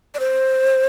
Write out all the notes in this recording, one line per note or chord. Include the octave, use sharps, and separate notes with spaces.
D5
C5